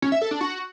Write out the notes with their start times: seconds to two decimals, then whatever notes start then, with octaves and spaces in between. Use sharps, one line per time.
0.02 C#4
0.12 E5
0.22 A4
0.31 D4
0.41 F#4